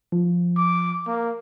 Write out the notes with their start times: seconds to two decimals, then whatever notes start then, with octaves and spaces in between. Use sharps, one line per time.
0.12 F3
0.57 D6
1.07 A#3